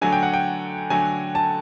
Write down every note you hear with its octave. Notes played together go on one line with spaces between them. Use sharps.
D3 F#3 A3 G#5
G5
F#5
G5
D3 F#3 A3 G#5
A5